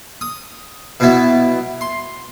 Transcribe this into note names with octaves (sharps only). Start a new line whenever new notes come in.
D#6
B2 F#3 B3 E4
C6